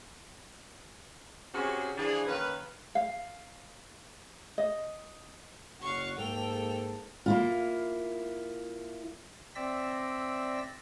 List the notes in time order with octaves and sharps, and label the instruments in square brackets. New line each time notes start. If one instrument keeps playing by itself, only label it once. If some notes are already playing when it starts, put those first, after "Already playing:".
[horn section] C3 C#4 F#4 G#4
E3 F3 D4 G#4
D#3 A#3 C#4 B4
[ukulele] F5
D#5
[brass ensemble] F#1 F#3 F#5 [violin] F5 C#6
[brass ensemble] G#2 A#3 A4 [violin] G5 F7
[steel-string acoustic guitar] A#3 E4 F4
[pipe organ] C4 D5 E5 E6 A#6